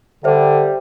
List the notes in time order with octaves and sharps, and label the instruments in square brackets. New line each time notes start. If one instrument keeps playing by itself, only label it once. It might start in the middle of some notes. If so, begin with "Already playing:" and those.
[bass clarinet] D3 [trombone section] G3 G4 [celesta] C5 E5